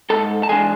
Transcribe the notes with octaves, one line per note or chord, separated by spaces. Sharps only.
G#2 A4 A5
A5
E3 G#3 D4 G#4 G#5